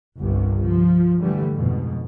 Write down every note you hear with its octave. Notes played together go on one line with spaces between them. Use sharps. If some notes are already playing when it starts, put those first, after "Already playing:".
G1 C2 G2 C3
F3
D3 E3 G3 A3
F2 G#2 B2